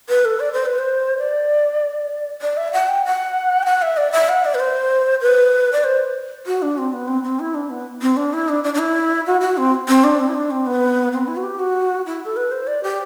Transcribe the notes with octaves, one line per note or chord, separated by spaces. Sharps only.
B4
A4
D5
C5
B4
C5
D5
D5
E5
F#5
G5
F#5
G5
F#5
E5
D5
E5
F#5
D5
B4
C5
B4
D5
C5
F#4
D4
C4
B3
C4
C4
E4
D4
B3
C4
D4
E4
D4
D4
D4
E4
F#4
F#4
C4
C4
D4
C4
E4
D4
C4
B3
C4
E4
F#4
G4
F#4
E4
A4
B4
C5
D5
G4